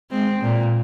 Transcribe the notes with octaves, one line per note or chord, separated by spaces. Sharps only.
G#3 C4
A#2